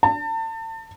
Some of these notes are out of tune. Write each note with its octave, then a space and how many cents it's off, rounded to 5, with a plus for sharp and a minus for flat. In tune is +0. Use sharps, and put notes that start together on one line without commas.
A5 +35